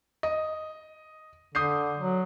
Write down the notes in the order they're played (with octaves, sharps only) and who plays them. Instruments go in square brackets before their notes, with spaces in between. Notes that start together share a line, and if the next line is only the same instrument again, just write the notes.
[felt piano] D#5
[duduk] D3 [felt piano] D#6 G6 C7
[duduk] F#3